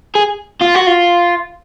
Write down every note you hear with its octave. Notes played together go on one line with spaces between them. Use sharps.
G#4
F4
F#4
F4